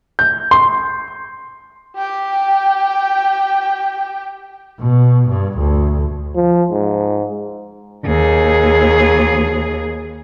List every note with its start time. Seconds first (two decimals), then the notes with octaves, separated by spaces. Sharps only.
0.19 G6
0.51 C6
1.97 G4 G5
4.80 B2
5.29 G2
5.59 D2
6.35 F3
6.71 G#2
8.05 D#2 G#4